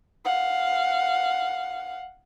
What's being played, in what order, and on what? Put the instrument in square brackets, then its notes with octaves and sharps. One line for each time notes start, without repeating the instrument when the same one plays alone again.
[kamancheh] F5 F#5